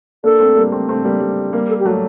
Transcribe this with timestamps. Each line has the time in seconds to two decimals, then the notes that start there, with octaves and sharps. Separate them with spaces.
0.24 A#3 D4 A4
0.40 A3 C4
0.55 G3 A#3
0.72 A3 C4
0.89 A3 C4
1.04 G3 A#3
1.20 G3
1.53 G3 A#3 A#4
1.69 A4
1.80 G4
1.85 F#3 A3 F#4